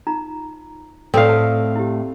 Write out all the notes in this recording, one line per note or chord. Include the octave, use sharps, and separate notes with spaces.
D#4 F4 A#5
A2 C4 A4 B4 D5 F5
A5 D#6
E4 G4